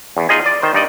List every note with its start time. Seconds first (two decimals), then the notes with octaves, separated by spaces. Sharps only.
0.17 E2
0.29 D#4 F4 G#4 D#5 G#5
0.46 D5
0.62 D#3 C5
0.74 G2 D#4 D5 D#5